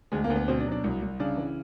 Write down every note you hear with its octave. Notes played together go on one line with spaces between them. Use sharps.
D2 G#3
A#3
D2
B3
B2 C4
D4
F#3
D4
C2
C2
C#3 D4
E3